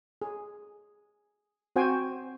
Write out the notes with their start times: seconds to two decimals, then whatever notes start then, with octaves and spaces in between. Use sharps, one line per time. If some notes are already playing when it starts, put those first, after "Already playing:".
0.22 G#4
1.76 C4 F#4 C5 G5 G#5